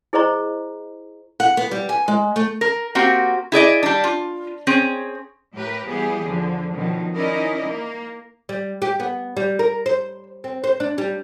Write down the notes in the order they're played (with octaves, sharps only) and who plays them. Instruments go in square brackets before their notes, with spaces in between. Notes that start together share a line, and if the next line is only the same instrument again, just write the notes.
[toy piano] E4 G#4 C5 D#5 A#5 C#6
[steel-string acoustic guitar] F#5
B3
G3
G#5
G#3
A3
[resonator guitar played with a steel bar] A#4
A#3 C4 F#4 G4
E4 G#4 D5 D#5
G3 D4
F4
C4 C#4 G#4
[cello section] A2 G4 A#4 B4
E3 G3 B3 G4 G#4
E2 D3 F3
B2 D3 D#3 F3 F#3
C#4 D#4 E4 A#4 D5 D#5
A#3
[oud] G3
G4
B3
G3
A#4
C5
C4
C5
D4
G3